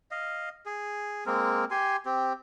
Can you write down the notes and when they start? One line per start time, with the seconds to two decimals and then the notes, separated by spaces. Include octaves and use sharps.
0.11 D#5 F5
0.66 G#4
1.26 G#3 A#3 C4 A#4
1.71 G4 G#5 C6
2.06 C4 G4